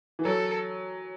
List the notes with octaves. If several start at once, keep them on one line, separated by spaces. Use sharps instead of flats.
E3
F#3 A4